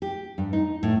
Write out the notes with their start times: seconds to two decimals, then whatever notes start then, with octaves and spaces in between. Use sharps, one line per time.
0.02 G4
0.38 G2
0.53 D#4
0.83 A2